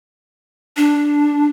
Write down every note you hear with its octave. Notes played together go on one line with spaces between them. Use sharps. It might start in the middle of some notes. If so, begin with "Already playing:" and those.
D4